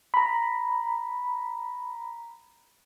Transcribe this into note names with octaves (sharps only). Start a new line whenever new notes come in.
A#5 B5